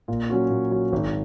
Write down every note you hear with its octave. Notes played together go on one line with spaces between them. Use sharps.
A#2
F#3 C#4 F#4
A#2
F#3 C#4 F#4
G#1